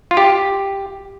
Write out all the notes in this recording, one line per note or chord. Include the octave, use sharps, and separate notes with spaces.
F4
G4